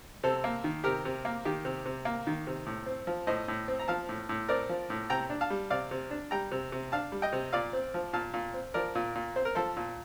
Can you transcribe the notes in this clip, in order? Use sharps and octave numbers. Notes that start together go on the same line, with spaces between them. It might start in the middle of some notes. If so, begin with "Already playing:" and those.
C3 A4 C5
A#3
D#3
C3 G4 A#4
C3
A#3
D#3 G4
C3
C3
A#3
D#3
C3
A2
C4
F3
A2 C5 D#5
A2
C4
A#5
F3 F5 A5
A2
A2
C4 A#4 D5
F3
A2
C3 G5 A#5
D4
F5 A5
G3
C3 D5 F5
C3
D4
G3 G5 A#5
C3
C3
D4 F5 A5
G3
D#5 G5
C3
A#2 D5 F5
C4
F3
A#2 F5 A5
A#2
C4
F3 A#4 D5
A#2
A#2
C4 C5
A#4
F3 A4 C5
A#2